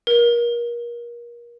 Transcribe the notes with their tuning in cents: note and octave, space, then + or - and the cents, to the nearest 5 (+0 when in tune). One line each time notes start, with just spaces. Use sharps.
A#4 +30